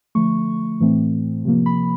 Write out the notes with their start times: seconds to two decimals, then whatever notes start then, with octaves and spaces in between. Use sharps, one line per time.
0.15 D3 F3 A3 C#6
0.80 A2 E3 A3 C4
1.45 C3 F3 A#3
1.66 B5